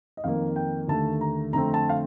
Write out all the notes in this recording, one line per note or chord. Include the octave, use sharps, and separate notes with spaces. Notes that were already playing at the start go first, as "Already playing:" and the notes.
D#5
F2 D#3 A#3 F5
G5
D#2 D3 A3 A5
A#5
F2 D3 A3 C4 A#5
A5
F5